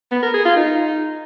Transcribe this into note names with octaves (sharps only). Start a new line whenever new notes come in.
B3
A#4
G#4
F4
D#4